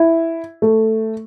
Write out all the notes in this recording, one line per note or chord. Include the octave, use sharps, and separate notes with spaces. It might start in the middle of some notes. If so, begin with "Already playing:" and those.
Already playing: E4
A3